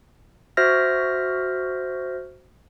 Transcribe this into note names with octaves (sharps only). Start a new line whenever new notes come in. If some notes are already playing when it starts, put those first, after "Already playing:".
F#4 C5 E5 F6 A#6